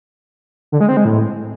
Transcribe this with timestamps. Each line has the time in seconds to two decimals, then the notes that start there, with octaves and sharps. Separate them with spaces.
0.72 D3
0.80 G#3
0.89 C4
0.97 G#3
1.05 A2